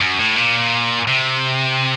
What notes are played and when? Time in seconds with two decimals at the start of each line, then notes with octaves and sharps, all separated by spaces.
0.01 F#2
0.19 A2
0.37 A#2
1.08 C3